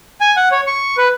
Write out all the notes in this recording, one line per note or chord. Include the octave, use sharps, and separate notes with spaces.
G#5
F#5
C#5
C#6
B4